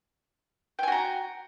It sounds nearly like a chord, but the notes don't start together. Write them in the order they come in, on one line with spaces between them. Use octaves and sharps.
G5 G#5 F#4 A#5